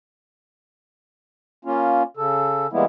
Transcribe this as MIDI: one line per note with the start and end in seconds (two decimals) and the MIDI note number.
1.65 2.03 58
1.65 2.03 61
1.65 2.03 65
2.17 2.67 49
2.17 2.67 69
2.73 2.85 52
2.73 2.85 55
2.73 2.85 56
2.73 2.85 58
2.73 2.85 59
2.73 2.85 64